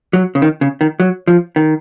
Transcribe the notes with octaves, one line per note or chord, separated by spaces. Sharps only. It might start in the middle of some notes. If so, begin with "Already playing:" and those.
F#3
C#3
D#3
C#3
D#3
F#3
F3
D#3